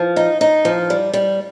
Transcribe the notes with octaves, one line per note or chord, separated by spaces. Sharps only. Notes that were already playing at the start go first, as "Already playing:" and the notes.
Already playing: F3
D#4
D#4
F3
G3
G3